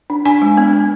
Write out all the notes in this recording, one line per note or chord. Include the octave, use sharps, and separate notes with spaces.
D4
D4 G#5
G#3
B3
B3